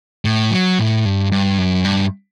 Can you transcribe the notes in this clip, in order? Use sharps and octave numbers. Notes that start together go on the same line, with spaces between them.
A2
F#3
A2
G2
G2
F#2
G2